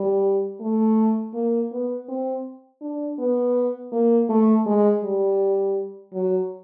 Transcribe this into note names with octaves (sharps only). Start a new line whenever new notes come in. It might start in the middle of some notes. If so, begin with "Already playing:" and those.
Already playing: G3
A3
A#3
B3
C4
D4
B3
A#3
A3
G#3
G3
F#3